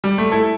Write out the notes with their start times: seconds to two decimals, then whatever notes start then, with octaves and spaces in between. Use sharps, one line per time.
0.04 G3
0.18 A3
0.32 E4 A4